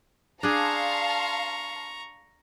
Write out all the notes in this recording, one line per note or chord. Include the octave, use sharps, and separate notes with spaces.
D4 G#4 F5 A5 A#5 C6 C#6